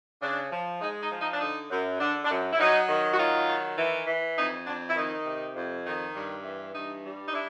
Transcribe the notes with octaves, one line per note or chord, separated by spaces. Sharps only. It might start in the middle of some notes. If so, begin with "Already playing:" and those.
C#3 D4
F3
G#3 D#4
D#4
F3
D#4
D4
D3 D#4
F#2
D3 D4
D4
F#2
E4
F#3 D#4
D#3
F#4
F#3 D#4 F4
D#3
E3
E3
F2 D#4
F2 D4
E4
D#3 D#4
C3
F2
D#3
G2
E3
G2 D#4
G3
D#4
D4 E4